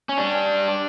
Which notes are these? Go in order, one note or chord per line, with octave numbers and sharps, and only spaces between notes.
C#4
G3 D4